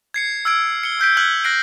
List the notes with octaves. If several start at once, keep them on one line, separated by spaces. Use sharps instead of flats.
G#6 C7 C#7
E6 F6 G#6 D7
C#7 G7
F6 G6 B6 D7
F6 F#6 G#6 B6 F#7
F#6 A#6 C7 D7